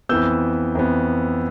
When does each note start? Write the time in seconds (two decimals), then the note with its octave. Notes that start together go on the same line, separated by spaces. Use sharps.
0.09 F2 E3 B3 E6 G6
0.75 F2 E3 B3